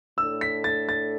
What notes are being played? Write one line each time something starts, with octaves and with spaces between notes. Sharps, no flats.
A2 A3 D4 A4 E6
B6
A6
A6